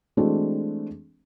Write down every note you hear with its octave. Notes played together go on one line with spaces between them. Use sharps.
E3 G#3 A3 C4 D4 F#4